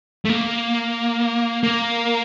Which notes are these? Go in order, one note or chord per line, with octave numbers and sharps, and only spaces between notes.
A3
A#3
A#3